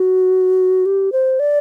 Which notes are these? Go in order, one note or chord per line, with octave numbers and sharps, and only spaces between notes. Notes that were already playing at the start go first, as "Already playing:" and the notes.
Already playing: F#4
G4
C5
D5